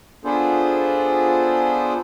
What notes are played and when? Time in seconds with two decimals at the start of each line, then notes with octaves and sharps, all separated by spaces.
0.25 B3 D4 F4 G#4 A4 C5